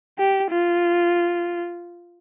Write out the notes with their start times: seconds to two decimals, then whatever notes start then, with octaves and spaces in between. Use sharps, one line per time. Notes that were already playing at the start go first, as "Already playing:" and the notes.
0.19 G4
0.51 F4